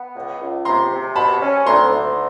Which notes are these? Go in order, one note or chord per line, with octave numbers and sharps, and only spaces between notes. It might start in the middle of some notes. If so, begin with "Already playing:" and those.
Already playing: B3
C#2
C#2
C3 A#5 C6
C3
B2 A5 B5
C#4
D2 A#5 C6
D2